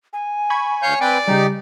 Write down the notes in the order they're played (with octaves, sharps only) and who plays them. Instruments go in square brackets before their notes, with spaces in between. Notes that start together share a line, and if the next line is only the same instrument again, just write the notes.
[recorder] G#5
[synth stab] B5 C#6 G#6
[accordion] D2 F5 G6 [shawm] C#5
[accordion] C4 B4 G5 [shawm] D5
[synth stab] C#3 G3 [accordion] D#4 G4